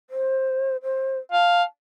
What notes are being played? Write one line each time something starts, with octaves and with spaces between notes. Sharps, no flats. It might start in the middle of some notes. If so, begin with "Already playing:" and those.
C5
C5
F5 A5